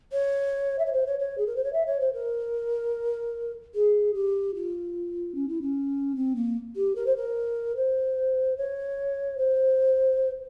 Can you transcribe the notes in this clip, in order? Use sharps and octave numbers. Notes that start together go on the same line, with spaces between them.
C#5
E5
C#5
C5
C#5
C#5
G#4
A#4
C5
C#5
E5
C#5
C5
A#4
G#4
G4
F4
C#4
E4
C#4
C4
A#3
G4
A#4
C5
A#4
C5
C#5
C5